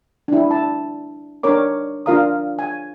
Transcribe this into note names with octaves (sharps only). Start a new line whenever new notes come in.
D4 E4
A5
D4 D#4 A#4 C#5 D6
D4 F4 A#4 F5 A#5 D#6
G#5